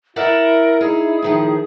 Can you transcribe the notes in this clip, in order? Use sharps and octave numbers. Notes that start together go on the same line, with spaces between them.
E4 A#4 D5 E5 F#5
D#4 G#4
A2 D#3 F3